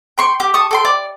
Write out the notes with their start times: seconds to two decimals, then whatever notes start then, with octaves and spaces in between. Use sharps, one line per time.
0.18 G5 C6 C#6
0.40 G4
0.54 A5 C#6 D#6
0.71 A4 G5 C6
0.85 D5